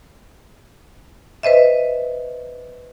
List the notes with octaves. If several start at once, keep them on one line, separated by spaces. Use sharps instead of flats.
B4 C5 D#5 E5